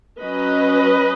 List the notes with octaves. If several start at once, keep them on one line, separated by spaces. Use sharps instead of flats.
F#3 C#4 B4 D#5